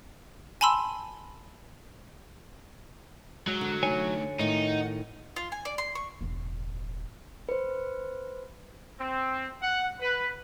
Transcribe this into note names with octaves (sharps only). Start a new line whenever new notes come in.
G#5 A5 B5 C6 E6
F#3 G#3 A#5
D3
A3 D#4 C#5 G#5
A2 D#3 D#4 F#5
F4
G#5
D5
C6
C#6
E1 A1
B4 C5
C4
F#5
B4